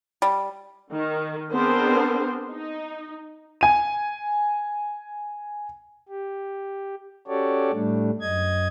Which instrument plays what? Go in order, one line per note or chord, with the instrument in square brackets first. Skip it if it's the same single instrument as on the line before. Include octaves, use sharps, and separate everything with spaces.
[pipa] G3
[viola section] D#3
B3 C4 D4 G#4 A#4 C5
D#4
[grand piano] G#5 D#7
[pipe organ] G4
C#4 F#4 G4 A4 C#5 D5
A2 G3 A3 D4
F#2 D#5 G#6